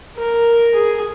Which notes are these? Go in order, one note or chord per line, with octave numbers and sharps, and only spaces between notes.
A#4
G#4